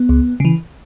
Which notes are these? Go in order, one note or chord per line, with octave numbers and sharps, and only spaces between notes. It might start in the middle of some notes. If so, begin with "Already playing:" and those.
Already playing: B3
C#2
C#3 E3